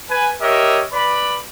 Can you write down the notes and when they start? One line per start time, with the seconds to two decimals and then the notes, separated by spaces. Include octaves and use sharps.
0.10 B4 G#5
0.42 G4 A#4 C#5 D#5 E5
0.93 B4 D5 B5